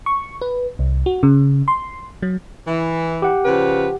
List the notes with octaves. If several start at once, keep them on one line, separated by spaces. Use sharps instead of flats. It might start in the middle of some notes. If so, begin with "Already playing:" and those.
C#6
B4
C2
F#4
C#3
C6
F#3
E3
G4 F#5
C#3 F3 B4